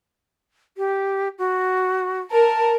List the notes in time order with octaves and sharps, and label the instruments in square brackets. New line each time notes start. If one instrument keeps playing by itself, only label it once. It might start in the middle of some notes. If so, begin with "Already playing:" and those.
[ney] G4
F#4
[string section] A#4 [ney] A5